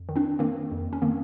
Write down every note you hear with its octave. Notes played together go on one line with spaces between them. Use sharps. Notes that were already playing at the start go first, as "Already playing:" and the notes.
Already playing: F2
D#3
C4 D4
D#3 A#3 C4
F2
C#4
D#3 A#3 C4